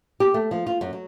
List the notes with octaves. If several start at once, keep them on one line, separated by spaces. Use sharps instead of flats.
G4
A3
F3
F4
F#2
F#3